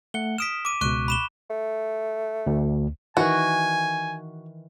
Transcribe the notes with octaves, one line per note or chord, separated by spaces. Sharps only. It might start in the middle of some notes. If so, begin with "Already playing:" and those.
A3 F#5 C#7 G7
D#6 F6 B6 D7 E7
D6 D#7
C#2 B2 C#6 F#6 D#7
B5 E7 G7
A3
D2
D#3 E3 F#4 G#5